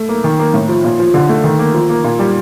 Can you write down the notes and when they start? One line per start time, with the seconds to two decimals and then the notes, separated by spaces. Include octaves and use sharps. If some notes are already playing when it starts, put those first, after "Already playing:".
Already playing: A3
0.09 A#3
0.24 D#3
0.39 A#3
0.54 A2
0.69 F3
0.84 A#2
0.99 F3
1.14 D3
1.29 A3
1.44 D#3
1.59 A#3
1.74 F3
1.89 A#3
2.04 A#2
2.19 G3